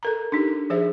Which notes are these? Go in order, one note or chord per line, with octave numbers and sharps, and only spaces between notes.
A4 A#4 A#5
D4 D#4 G4
F3 G#4 C5 E5